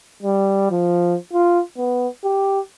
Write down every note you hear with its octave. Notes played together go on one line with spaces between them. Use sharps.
G3
F3
F4
B3
G4